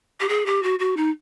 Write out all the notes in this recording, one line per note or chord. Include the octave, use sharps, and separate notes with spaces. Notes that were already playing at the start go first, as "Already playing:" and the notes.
G4
G#4
G4
F#4
F#4
D#4